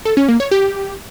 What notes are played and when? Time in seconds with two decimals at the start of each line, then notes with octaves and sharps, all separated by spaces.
0.05 A4
0.17 C#4
0.28 A#3
0.40 C#5
0.51 G4